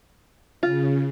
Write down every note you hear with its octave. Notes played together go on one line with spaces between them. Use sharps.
C#3 F4